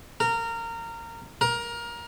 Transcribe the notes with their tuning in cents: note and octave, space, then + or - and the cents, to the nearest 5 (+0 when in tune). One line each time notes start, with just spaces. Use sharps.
A#4 -20
A#4 +20